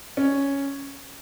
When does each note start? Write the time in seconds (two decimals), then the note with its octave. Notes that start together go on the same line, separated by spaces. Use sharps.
0.17 C#4